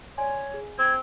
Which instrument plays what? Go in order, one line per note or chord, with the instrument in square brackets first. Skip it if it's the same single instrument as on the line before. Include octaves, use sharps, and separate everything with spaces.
[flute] C#5 [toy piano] D5 G#5 C6
[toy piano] G#4
[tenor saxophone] C4 [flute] G#6